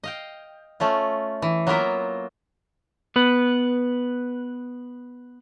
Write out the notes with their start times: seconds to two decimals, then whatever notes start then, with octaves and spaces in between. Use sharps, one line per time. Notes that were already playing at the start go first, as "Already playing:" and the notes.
0.04 D#5 F5 G5
0.80 A3 C#4 F4
1.42 E3
1.67 F#3 A#3 B3 F4 A#4 E5
3.16 B3 B4